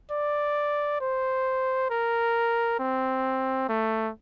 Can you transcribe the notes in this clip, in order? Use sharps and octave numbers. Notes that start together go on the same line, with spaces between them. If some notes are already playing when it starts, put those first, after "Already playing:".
D5
C5
A#4
C4
A3